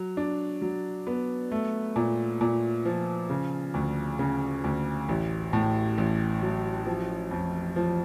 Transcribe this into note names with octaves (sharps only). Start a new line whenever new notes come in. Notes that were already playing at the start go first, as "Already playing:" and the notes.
Already playing: F#3
D4
F#3
B3
A3
A#2
A#2
F3
C#3
D2
C#3
D2
A1
A2
A1
F#3
F3
F2
F3